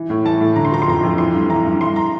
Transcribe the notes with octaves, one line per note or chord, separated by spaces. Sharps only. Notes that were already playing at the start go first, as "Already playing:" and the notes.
Already playing: E3
A2
E3 A5
A2
D3 A#5
C6
F3 A#5
C6
F2 A#5
F2
E3 C6
G2
E3 A#5
G2
E3 C6
A#5